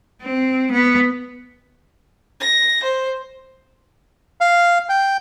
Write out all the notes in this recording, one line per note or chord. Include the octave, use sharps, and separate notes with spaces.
C4
B3
A#6
C5
F5
G5